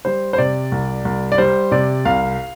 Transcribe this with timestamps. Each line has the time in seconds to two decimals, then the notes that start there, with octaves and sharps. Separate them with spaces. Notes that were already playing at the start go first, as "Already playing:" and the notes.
0.05 G3 C5
0.33 C5
0.38 C3 D5
0.72 C2
1.05 C2
1.32 D5
1.38 G3 C5
1.71 C3 D5
2.05 C2 F5